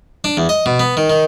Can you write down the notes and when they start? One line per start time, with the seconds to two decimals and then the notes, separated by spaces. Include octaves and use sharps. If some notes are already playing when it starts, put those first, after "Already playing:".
0.24 D4
0.37 E2
0.49 D#5
0.66 B2
0.80 B3
0.97 D#3
1.10 D#3